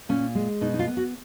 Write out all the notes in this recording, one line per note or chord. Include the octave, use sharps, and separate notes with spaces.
A#2 C#4
G#3
B2 D#4
D#4
F4
B3
F#4